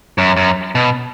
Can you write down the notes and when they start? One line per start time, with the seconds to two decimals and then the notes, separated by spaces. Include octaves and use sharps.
0.18 F#2
0.37 F#2
0.75 B2